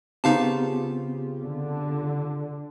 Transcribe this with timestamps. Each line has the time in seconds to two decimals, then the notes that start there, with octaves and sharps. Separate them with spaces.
0.24 C#3 B3 C4 D#4 F4 G4 F5 A5
1.42 D3